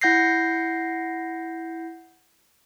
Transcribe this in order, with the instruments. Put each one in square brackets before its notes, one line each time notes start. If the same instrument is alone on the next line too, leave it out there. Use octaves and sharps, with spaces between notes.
[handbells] E4 F#5 G6 A#6 C7